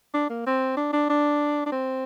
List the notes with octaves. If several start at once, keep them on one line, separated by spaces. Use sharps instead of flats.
D4
A#3
C4
D4
D4
D4
D4
C4